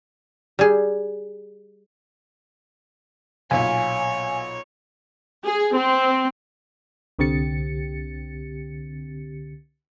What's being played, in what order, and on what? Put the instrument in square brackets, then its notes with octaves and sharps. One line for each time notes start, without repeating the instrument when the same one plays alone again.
[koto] G3 G#4
[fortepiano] B1 A#2 [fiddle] C#5 [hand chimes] F5 [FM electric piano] G#5
[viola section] G#4
C4
[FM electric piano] C2 D3 C4 G4 A6 C#7